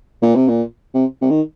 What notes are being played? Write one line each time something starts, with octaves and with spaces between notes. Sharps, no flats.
A#2
C3
A#2
C3
C3
D#3